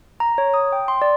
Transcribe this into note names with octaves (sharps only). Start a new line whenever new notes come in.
A#5
C#5
D#6
G5
C6
D5